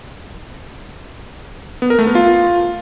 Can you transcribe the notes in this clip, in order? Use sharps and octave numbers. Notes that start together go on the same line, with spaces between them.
B3
A#4
A3
B3
F4